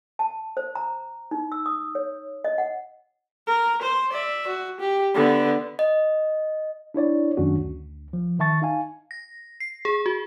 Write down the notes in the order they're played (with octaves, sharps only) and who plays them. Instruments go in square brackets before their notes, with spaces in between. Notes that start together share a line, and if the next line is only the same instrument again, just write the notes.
[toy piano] A5
C5
A#5
D#4
E6
D#6
C#5
D#5
F#5
[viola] A#4
C5
D5 E5
F#4
G4
D3 B3
[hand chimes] D#5
[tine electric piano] D4 E4 C#5 D5
F#2 D#3 A3 C#4 D4 F#4
D2
F3
D#3 E5 A5 C#6 A6
D#4 F5 G#5
[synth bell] A#6
C7
G#4
F#4